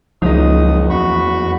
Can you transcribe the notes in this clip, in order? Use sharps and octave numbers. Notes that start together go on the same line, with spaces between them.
F#1 C#2 F3 D#4 D#6
E2 F#4 B5 C#6